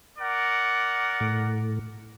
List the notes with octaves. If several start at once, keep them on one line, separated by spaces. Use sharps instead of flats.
A#4 D5 F#5
A2